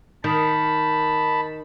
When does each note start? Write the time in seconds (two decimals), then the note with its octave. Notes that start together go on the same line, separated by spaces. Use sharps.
0.24 D#3 A5 B5